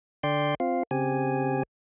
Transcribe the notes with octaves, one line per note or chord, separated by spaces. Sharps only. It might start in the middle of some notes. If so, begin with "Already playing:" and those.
D3 D5 G5 C6
C4 F4 F5
C#3 C4 G4 G#5